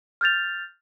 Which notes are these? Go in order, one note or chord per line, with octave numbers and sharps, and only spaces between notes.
F6 G6 A6 F7